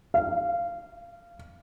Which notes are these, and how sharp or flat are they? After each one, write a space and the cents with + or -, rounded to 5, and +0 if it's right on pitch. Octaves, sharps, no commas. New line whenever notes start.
F5 -20